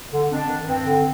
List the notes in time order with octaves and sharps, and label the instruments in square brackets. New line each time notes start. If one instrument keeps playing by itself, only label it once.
[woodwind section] D3
F2 D4
D#3
G2 C4
D3